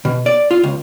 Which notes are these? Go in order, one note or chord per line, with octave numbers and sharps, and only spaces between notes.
B2
D5
F4
C#2